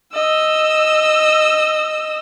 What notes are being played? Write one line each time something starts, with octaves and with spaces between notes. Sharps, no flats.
D#5 E6